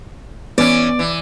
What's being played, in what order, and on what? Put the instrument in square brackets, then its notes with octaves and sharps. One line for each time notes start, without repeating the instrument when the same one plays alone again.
[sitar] E3 C#4 [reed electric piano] B3 [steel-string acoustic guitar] D5
[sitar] E3